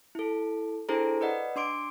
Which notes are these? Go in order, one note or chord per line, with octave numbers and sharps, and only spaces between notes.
E4 A4
D4 E4 G#4 A4 C5 A#5
B4 D5 D#5 F#5
D4 C6 D6 D7